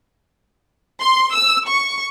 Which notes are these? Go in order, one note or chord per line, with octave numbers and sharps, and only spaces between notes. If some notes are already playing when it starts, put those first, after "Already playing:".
C6
E6
C#6